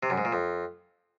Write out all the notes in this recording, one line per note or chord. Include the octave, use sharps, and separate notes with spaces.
C3
F#2
G#2
A#2
F2